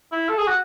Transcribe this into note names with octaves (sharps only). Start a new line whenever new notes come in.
E4
A4
G#4
F#4